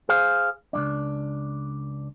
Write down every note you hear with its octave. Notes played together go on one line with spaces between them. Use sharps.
G#4 C5 F5
C#2 F#2 D4